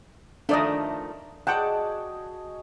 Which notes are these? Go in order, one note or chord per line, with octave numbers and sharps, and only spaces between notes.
D#3 F3 A3 D4 D5 D#5
F#4 G#4 D5 D#5 F#5 G5 A5